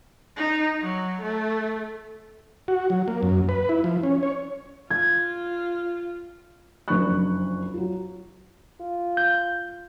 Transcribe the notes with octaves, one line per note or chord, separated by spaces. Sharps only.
D#4
F#3
A3
F#4
F#3
A#3
F#2
B4
E4
F3
C#4
C#5
F4 G#6
F#1 F2 D4 B5 C#6 F#6
F#3 F4
F4
G6